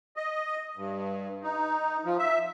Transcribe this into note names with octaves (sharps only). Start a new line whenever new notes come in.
D#5
G2
D#4
F3
E5